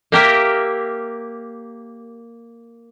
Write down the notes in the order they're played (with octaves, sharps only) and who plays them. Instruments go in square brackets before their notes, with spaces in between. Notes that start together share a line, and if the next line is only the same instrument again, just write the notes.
[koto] A#3 G4 A#4 E5